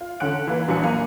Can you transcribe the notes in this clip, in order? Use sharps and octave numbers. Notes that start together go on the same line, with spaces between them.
F4
D3 C#4 F#5 F#6 D7
E3 A#3 B4
A#1 E3 F#3 G#5 F#6 C#7
A#3 D#7